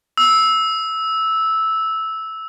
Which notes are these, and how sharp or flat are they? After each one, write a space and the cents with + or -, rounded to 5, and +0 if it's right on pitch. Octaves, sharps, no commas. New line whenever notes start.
E6 -10